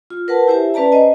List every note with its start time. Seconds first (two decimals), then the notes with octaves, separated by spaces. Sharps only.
0.10 F4
0.28 A#4 B4 F#5 A5
0.47 E4 G4 C5 E5 G#5
0.74 C#4 B4 D5 A5 A#5
0.92 C5 D#5 G#5